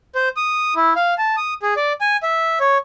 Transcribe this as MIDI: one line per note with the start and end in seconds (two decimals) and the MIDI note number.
0.15 0.29 72
0.37 0.74 87
0.76 0.94 64
0.96 1.14 77
1.18 1.36 81
1.37 1.54 87
1.62 1.74 68
1.77 1.93 74
2.01 2.17 80
2.23 2.59 76
2.60 2.78 73